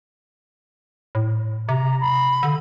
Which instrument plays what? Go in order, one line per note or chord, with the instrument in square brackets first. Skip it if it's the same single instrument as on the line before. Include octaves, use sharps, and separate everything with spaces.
[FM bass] A2
[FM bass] C3 [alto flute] A#5
[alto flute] B5
[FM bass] D3